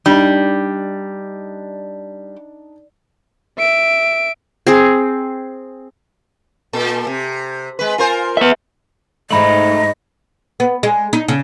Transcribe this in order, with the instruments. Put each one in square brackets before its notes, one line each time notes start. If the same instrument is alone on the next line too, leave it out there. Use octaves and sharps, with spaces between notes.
[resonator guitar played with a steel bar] G3 [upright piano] D4 D#4
[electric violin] E5 D7
[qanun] C4 G#4
[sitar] A#2 A4
C3
G#3 B4
F4 A#4 C5
[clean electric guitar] B3 E5
[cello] G#2 [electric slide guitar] A3 D#4 [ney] D#5 [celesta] E5 B5 F#7
[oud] B3
G#3
D#4
C#3